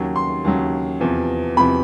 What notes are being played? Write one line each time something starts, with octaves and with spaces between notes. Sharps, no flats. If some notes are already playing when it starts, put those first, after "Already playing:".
Already playing: D#2 C#3 F#3
C6
D#2 C#3 F#3
E2 C3 F3
E2 C3 F3 B5